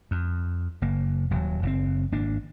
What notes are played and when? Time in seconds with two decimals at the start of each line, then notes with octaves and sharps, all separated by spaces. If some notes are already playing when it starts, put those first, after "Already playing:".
0.11 F2
0.82 F#1 A#3
1.31 D#1 F#3
1.63 F#1 C3 C4
2.12 G#1 A#3 D4